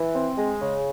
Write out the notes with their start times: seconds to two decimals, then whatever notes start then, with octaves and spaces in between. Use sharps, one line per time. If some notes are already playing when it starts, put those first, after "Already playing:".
Already playing: E3
0.14 C4
0.37 G#3
0.61 C#3